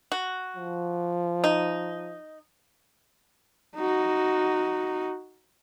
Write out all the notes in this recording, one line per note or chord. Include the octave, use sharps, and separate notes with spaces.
F#4
F3
D#4
D#4 F#4